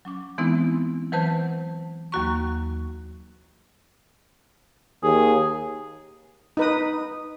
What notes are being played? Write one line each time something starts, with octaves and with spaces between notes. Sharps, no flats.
F#3 C#4 D6
E3 G#3 B3 C4 D#4 E4
E3 F#3 B4 C5 A5 G6
D#2 F#3 A#3 F#4 A#5 C#6
D#2 G#4
D#4 B4 D#6